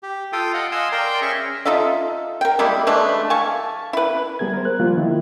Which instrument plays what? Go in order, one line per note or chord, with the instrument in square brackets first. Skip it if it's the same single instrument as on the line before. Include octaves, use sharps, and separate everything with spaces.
[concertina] G4
F4 A4 F5 G5 D#6
D#5 F5 F#5
D#5 F5 G#5 C6 D#6 E6
A#4 D5 G5 A#5 C6
C#4 G#4 E5 G#5 C#6
[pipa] D#4 F4 A4 E5
A#4 G5
G3 G#3 A#3 E4
E3 G#3 A3 D4
F5 G#5 A5 C#6
E4 B4
[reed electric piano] G3 B3 G#4 A#4 G#6
A#4 C5
F#6
F3 G3 A#3 F4
D#3 E4